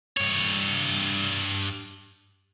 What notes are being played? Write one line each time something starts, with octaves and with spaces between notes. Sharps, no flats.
G2 C#5